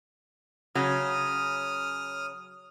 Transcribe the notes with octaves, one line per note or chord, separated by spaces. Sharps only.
C#3 F#3 C#4 D#6 F6